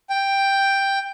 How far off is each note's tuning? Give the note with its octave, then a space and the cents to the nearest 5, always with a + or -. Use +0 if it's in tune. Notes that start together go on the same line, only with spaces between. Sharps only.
G5 +5